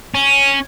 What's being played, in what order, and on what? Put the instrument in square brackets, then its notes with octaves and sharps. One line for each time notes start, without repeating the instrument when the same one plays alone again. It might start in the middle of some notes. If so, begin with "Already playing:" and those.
[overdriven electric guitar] C#4